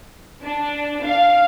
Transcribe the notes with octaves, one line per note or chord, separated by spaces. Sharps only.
D4
F5